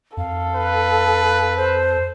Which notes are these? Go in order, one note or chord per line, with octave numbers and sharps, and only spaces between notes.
F2 A4 F5
B4
C5